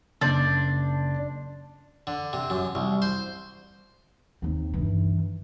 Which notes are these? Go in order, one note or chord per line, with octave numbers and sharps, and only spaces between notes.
F#1 D4 C6 G6
D3
C3
F#2
C2
C5
D#2 C4
G2 E3